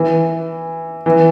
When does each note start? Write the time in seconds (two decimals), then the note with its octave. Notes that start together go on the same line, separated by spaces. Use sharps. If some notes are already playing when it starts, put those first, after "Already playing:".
Already playing: E3
1.06 E3